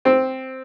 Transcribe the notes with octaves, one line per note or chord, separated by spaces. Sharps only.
C4